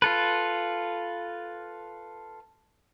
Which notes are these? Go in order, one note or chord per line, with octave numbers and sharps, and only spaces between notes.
F4 A4 B4